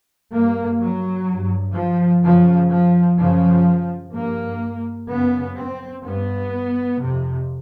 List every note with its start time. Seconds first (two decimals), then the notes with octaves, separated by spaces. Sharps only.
0.32 G2 A#3
0.80 F#3
1.27 G2
1.74 F3
2.22 F#2 C#3 F3
2.69 F3
3.17 F#2 C#3 F3
4.12 G2 A#3
5.08 F#2 C#3 B3
5.55 C4
6.03 G2 B3
6.98 F2 C3